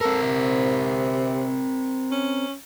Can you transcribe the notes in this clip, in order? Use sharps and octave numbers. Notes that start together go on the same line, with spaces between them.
C4 A4 A#4
C3
C#4